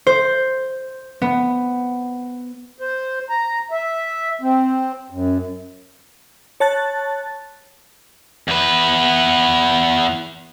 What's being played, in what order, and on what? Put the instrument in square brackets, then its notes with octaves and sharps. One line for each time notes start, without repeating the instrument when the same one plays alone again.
[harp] C5
B3
[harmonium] C5
A#5
E5
C4
F#2
[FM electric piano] C#5 A5 F#6 A6
[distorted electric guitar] E2 B4